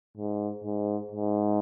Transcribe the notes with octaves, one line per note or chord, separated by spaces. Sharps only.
G#2
G#2
G#2